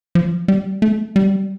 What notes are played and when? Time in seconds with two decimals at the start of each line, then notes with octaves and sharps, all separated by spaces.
0.15 F3
0.48 G3
0.82 A3
1.16 G3